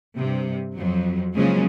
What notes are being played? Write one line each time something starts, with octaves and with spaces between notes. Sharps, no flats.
G2 C3
F2 F#3
C#3 F3 F#3 G#3 A#3 C#4